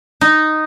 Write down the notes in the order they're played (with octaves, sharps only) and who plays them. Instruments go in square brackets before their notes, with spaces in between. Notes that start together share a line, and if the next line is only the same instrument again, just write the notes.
[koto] D#4